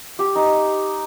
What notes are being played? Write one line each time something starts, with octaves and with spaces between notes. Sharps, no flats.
G4
D#4